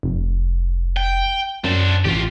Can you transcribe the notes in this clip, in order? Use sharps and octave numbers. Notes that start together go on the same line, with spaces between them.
F1
G5
F#2 D4 C5
A1 F4 G4